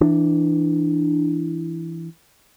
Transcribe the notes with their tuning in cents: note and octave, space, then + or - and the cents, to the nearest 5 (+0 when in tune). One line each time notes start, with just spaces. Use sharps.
E3 +5 D4 +15